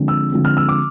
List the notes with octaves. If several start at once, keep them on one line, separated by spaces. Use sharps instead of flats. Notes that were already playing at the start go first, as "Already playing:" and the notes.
Already playing: D3 F3 G#3 C4
E6
D3 F3 G#3 C4
F6
E6
D6